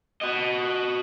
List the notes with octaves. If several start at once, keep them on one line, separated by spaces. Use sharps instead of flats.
F#4 D#5